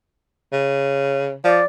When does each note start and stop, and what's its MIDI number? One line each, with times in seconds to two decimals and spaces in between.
0.52 1.36 49
1.44 1.61 53
1.44 1.65 74